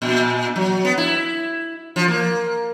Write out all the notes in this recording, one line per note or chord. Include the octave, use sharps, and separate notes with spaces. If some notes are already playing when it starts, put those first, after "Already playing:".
A#2
F#3
B3
E4
F3
A#3